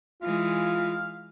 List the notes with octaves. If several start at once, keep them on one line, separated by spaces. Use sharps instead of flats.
E3 G#3 F4 F5